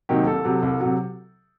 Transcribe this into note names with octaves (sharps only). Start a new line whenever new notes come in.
C3 D#3 F#3 A#3 G4
C2 A4
C3 F#3
C2
F#3
C3